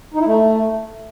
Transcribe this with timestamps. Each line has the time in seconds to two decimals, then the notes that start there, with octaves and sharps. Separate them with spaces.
0.14 D#4
0.20 E4
0.26 A3